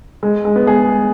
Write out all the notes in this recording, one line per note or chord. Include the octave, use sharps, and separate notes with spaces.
G#3
G#3
B3
G#4